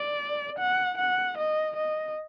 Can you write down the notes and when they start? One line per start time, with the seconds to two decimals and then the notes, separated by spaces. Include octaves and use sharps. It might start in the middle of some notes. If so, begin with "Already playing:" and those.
Already playing: D5
0.59 F#5
0.98 F#5
1.38 D#5
1.76 D#5